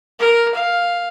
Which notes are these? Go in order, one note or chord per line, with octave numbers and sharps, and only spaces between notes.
A#4
F5